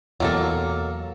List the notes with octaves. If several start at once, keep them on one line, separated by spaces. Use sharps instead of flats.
E2 B2 F#3 A#3 A4